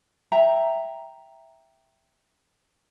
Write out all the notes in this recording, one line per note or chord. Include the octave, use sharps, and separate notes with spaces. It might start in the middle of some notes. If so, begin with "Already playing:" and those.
E5 G5 A#5